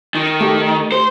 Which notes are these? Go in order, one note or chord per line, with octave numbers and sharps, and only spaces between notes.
D#3
A3 G4
C5